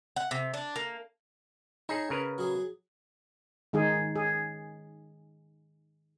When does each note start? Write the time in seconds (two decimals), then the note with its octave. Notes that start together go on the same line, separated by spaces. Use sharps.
0.16 F#5
0.31 C3
0.54 D4
0.76 A#3
1.89 D#4 G#4 C#5 A5 B5
2.10 C#3 A#4 B4
2.38 F#3 G#4
3.73 D#3 G#3 D#4 G#4
4.16 G#4